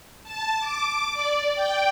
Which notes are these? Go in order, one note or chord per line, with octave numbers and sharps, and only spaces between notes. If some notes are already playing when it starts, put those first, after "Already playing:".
A5
D6
D5
G5